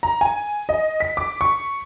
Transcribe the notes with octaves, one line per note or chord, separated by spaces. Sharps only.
A#5
G#5
D#5
B6
D6
C#6